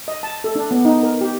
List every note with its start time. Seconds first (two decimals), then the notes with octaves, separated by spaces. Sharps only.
0.08 D#5
0.23 A5
0.44 A4
0.56 D4
0.71 B3
0.85 D#4
1.03 A#4
1.21 G4